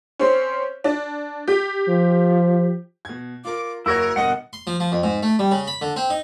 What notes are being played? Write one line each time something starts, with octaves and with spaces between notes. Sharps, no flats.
C4 C#4
D4
G4
F3
B2 G#6
F4 A#4 D6
F#1 E4 F#4 A#4 C#5
G1 B2 A#4 D#5 F#5
C6
F3
F3
F2
G#2
A3
G3
C#3
B5
D3
C4
D#4